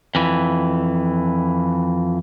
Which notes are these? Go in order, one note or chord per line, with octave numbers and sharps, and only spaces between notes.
F2 E3